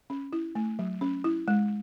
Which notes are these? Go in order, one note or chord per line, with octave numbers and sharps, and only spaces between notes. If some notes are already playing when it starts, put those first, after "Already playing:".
C#4
E4
A3
F#3
C#4
E4
G#3